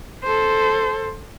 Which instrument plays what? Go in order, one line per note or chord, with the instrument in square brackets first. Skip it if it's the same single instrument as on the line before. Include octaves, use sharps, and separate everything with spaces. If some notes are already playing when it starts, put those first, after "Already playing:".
[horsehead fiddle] A4 C5